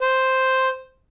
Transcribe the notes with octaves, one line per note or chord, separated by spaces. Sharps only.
C5